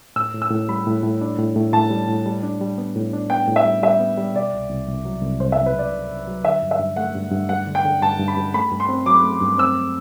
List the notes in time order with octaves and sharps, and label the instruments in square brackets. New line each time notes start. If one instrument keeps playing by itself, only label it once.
[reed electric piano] A2 [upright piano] E6
[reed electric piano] A2
[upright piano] E6
[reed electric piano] A2
[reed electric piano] G3 [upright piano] B5
[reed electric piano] A2
A2
D4
A2
A2
[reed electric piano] A2 [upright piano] A5
[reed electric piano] G3
A2
G3
D4
G3
B3
A2
D4
[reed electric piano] B3 [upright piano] G5
[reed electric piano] A2
[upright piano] E5
[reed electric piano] G3
[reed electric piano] G3 [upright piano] E5
[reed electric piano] B3
G3
[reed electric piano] B2 [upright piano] D5
[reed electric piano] C2
C2
C2
F#3
C2
[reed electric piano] C2 [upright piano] C5
[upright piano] E5
[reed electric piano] C2
[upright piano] B4
[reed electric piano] C2 [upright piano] D5
[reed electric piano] C2
C2
F#3
[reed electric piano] D3 [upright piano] E5
[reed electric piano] G2
[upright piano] E5
[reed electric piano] G2
[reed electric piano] A3 [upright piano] F#5
[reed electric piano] G2
G2
[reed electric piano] G2 [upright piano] F#5
[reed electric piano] D3
[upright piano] G5
[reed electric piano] D3
[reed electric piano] G2 [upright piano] A5
[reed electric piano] G2
[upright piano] B5
[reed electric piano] G2
[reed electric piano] A3 [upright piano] B5
[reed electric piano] G2
[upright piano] C6
[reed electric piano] C4
[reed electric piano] F#3 [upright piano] D6
[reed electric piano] A3
G2
[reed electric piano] C4 [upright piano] E6